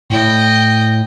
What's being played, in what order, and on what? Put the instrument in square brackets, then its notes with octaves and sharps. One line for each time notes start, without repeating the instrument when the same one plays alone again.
[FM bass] A2 [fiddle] D#5 G5